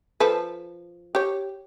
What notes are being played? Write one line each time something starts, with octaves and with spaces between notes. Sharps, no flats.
F3 A4 B4
G4 C#5